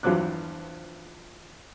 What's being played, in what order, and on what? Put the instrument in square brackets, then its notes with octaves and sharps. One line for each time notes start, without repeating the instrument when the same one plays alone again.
[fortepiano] E2 G2 F3 F#3 D6 F#6